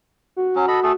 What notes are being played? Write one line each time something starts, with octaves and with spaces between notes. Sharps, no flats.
F#4
F#3 C#4
A4 D#5 B5
A3 G#4 A4